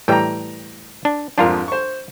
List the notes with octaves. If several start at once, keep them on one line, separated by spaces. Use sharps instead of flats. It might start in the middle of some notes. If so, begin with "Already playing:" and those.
A2 E3 G3 G5 A#5
D4
F2 G#2 F3 D4 F4 A#4
C5 C#6